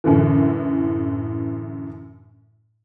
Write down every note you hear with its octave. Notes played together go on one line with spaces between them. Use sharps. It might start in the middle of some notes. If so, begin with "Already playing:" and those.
F#2 A2 D3 E3